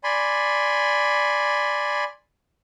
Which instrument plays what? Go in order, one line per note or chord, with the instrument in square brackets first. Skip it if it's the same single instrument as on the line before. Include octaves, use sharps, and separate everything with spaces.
[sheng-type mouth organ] D5 G#5 B5 C6